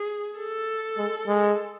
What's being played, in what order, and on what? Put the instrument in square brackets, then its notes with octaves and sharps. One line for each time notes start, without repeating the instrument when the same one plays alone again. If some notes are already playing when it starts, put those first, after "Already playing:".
Already playing: [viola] G#4
A4
[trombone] G#3
G#3